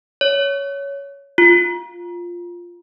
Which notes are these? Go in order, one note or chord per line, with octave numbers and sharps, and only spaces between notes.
C#5
F4